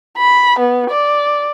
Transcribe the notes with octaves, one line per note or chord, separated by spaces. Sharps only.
B5
B3
D5